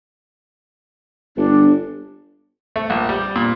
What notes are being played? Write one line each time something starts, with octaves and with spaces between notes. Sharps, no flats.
G1 D4
A3
A#1
G3
A#2